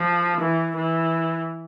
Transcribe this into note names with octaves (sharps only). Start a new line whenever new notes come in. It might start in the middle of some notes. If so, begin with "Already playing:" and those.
Already playing: F3
E3
E3